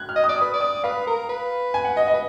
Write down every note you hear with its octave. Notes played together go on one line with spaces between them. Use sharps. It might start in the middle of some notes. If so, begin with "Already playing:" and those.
Already playing: F#6 G#6
F6
D#5
D5 D#6
B4 D#6
D5
D#6
B4 F5
A#4
B4
G#5
F#5
D#5
D#5
B4